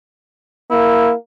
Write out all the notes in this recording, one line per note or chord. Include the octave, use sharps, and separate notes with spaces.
A#3 E4